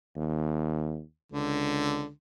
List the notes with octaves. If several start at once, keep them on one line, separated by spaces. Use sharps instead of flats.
D#2
C#2 D3